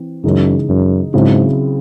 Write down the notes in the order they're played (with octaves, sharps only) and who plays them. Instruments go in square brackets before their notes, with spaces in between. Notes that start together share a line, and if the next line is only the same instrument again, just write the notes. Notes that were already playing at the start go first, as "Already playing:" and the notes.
Already playing: [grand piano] E3 C4
[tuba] F#2 [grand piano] C#3 E3 G#3 D#4
[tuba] F#2
[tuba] G#2 [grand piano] C#3 F#3 C4 E4